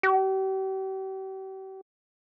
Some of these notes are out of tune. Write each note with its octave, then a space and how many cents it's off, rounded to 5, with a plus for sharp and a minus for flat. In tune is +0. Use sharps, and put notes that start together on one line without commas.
G4 -40